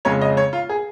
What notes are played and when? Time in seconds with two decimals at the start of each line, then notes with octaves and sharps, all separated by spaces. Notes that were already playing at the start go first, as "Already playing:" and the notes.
0.05 F2 C#3 G#3 C#4 C#5
0.21 D#5
0.37 C#5
0.53 F4
0.69 G#4